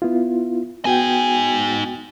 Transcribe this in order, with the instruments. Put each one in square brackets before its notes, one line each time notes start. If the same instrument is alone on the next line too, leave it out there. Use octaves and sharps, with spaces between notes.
[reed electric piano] B3 E4 F4
[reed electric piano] B3 F#4 G5 [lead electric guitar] D#4 G#5